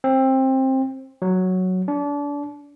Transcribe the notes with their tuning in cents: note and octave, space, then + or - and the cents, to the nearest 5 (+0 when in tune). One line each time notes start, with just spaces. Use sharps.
C4 +20
F#3 +0
D4 -30